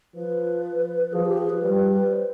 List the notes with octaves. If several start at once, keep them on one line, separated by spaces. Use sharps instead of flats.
F3 B4
F3 G#4
G4
G#4
B4
G3
C5